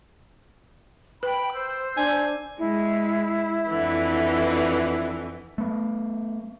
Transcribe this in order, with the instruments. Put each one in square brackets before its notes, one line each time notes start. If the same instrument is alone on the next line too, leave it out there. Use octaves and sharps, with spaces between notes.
[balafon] B4 [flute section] G5 B5
[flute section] C5 E6
[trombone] D4 [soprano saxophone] G#5
[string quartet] G#3 [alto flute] E4
[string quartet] F2 D3 E3
[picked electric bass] A3 B3